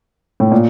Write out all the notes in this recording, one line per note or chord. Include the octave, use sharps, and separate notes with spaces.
A2
A#2